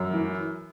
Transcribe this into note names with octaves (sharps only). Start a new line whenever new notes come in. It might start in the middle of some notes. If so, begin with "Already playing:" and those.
Already playing: F#2
E3